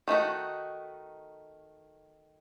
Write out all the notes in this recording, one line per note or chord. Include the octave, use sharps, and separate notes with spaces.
D#3 A3 D#4 F#4